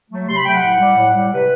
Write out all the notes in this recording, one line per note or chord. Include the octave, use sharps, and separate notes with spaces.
F#3 A3
C3 C6
B5
F#3 A3 G5
F#5
A2
G3
A2
G3
C3 B4